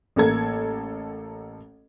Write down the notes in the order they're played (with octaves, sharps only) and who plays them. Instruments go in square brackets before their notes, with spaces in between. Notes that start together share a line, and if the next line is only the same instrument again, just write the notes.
[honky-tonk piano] A1 A#3 A4 G#6